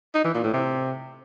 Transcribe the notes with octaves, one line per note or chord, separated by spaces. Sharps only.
D#4
E3
A#2
A2
C3